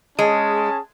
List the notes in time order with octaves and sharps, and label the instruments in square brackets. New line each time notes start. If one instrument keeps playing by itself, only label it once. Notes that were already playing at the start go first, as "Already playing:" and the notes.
[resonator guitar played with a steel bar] G#3 [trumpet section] C#4 G#4 A5